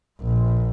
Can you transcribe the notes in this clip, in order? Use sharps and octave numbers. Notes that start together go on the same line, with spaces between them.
A#1